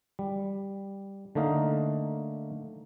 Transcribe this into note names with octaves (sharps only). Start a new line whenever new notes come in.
G3
D3 A3 A#3 D#4 A#4